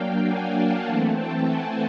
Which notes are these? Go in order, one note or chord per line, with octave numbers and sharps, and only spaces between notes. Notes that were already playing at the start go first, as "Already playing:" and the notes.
Already playing: F#3 A#3 D4 F5 G5
F#5 G#5
G5 A5
E3 A3 C4 F#5 G#5
G5 A5
F#5 G#5